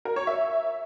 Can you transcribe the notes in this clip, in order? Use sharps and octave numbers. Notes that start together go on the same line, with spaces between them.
A#4
C#5
E5